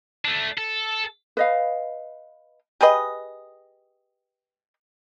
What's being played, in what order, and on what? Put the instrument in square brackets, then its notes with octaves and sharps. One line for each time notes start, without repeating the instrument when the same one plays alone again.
[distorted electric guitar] A3 D4
A4
[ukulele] B4 D#5 F5
[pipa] G4 G#4 B4 D#5